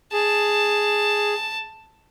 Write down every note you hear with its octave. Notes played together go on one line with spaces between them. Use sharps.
G#4 A5